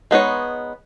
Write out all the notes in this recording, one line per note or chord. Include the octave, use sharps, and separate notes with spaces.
G#3 B3 D#4 C#5